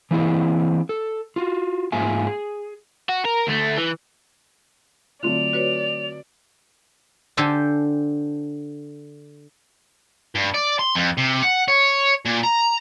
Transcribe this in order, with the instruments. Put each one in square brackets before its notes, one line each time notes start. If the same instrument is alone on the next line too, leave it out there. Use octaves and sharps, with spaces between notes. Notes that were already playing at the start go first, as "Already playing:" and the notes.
[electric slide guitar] E3 A#3 C4 E4 G#4 D#5
A4
F4 F#4
G#2 A#3 F4 G#4 E5 G#5
G#4
[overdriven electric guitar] F#4
A#4
D2 A3
E3
[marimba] D3 C4 [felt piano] F#3 A3 F4 [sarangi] D5 [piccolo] F7
[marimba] F#4 B4 C#5
[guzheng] D3 G4 A4 C5 G#5
[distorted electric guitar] G2
D5
C6
F2
C3
F#5
C#5
A#2
A#5